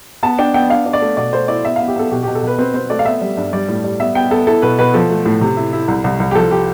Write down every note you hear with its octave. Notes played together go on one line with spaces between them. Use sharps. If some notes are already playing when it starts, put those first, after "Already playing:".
B3 A5
D4 G5
B3 G5
D4 F5
D4
D5
A3
B2 D5
A3 C5
E4 D5
B3 E5
B3 F5
G4
B3 A4
B2 G4
B2 G4
A4
B2 B4
C4 B4
C4 C5
A3 D5
F5
B3 E5
G3
G2
G3 D5
A2
G3
B3 E5
B3 G5
B3 A4
E4 A4
B2 B4
B2 B4
F3 A4
A3
A2
C3
E4
E4
C2
C2
C2
G4
F3 A4
G4